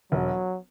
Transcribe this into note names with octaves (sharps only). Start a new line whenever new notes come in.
E1 F#3